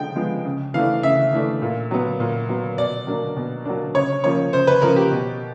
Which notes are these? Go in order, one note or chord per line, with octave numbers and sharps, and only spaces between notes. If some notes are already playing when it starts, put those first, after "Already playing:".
Already playing: D3 F3 G#3 G5
F3 G#3 B3
C#3
E3 A3 D4 F5
C#3 E5
E3 A3 D4
A#2
F#3 B3
A#2
F#3 B3
B2 D5
F#3 A#3 D4
B2
F#3 A#3 D4
C#3 C#5
F3 A#3 C#4 C#5
C#3 C5
B4
F3 A#3 C#4 A#4
G4
B2